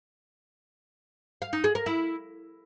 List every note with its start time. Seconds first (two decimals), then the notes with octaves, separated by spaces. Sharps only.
1.42 F5
1.53 D#4
1.64 G#4
1.75 A#4
1.86 E4